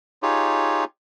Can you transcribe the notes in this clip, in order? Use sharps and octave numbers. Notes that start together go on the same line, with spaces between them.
D#4 F4 G4 G#4 C#5